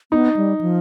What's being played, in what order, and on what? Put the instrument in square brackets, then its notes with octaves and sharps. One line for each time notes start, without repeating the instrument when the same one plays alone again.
[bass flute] B3 [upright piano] D#4
[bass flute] G3
F3